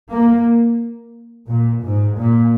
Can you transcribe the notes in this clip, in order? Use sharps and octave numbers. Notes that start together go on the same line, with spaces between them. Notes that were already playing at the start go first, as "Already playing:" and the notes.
A#3
A#2
G#2
A#2